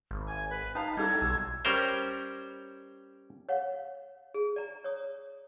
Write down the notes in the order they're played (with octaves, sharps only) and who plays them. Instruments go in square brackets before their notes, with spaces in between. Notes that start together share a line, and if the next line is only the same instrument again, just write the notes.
[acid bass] G#1
[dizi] G#5
B4
[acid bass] D#4 [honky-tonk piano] B4 A5 [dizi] F5
[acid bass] G3 [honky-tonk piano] D#4 E4 A4 [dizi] G#6
[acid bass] B1 [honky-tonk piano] E6
[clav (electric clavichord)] G3 C#4 A#4 C5
[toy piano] C#5 F5 F#5
G#4
D5 A#5
C#5 D#6